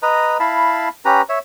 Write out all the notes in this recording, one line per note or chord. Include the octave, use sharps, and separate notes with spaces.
B4 D#5 A#5
E4 F5 A5 B5
C#4 G4 B4 A#5
C#5 E5